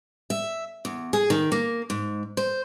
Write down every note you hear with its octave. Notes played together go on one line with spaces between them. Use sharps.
E5
E2
G#4
D#3
A#3
G#2
C5